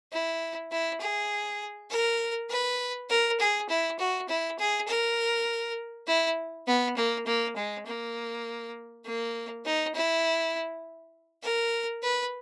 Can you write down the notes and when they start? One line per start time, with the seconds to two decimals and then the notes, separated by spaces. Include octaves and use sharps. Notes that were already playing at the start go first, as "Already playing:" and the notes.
0.12 E4
0.72 E4
1.01 G#4
1.91 A#4
2.50 B4
3.10 A#4
3.40 G#4
3.69 E4
3.99 F#4
4.29 E4
4.59 G#4
4.88 A#4
6.07 E4
6.67 B3
6.97 A#3
7.26 A#3
7.56 G#3
7.86 A#3
9.05 A#3
9.65 D#4
9.95 E4
11.43 A#4
12.03 B4